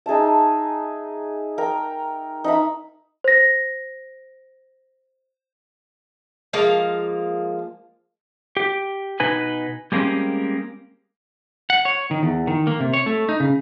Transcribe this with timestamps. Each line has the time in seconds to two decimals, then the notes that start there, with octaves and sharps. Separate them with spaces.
0.06 D#4 G#4 E5 A5
1.58 A#4 G5
2.44 D#4 E5 B5
3.24 C5 A#6
6.53 F3 G#3 A#3 F5
8.57 G4
9.20 B2 D#4 B4 G#5
9.92 G3 G#3 A#3 C4 C#4 G4
11.70 F#5
11.85 C#5
12.11 D#3
12.23 E2
12.47 D#3
12.67 A#3
12.80 C3
12.93 C#5
13.06 A3
13.29 D#4
13.40 C#3